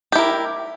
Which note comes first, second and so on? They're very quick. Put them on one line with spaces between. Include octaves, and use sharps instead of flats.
G4 E4 A#4